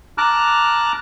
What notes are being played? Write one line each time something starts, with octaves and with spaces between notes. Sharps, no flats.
A5 A#5 D6 F6 F#6